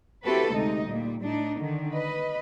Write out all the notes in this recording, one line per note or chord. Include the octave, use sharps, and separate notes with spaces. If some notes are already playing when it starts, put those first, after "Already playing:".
C4 E4 F#4 G4 A4 B4
D2 C3 G#3 D#4 D#5
A#2 G3
A2 D4 D#4
D3 D#3
B4 D#5